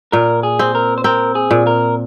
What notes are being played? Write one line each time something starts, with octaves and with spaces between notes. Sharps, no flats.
A#2 A#4
G#4
C4
A#4
C5
C4 A#4
G#4
A#2
A#4